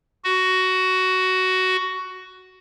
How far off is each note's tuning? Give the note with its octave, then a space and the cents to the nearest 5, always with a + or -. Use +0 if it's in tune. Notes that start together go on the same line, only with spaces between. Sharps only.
F#4 +10